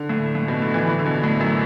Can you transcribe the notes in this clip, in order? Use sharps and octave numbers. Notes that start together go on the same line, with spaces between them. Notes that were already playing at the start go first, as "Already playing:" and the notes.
Already playing: D3
A2
A2
B2
D3
E3
E3
D3
B2
A2
F#2